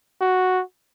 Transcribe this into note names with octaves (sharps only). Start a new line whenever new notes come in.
F#4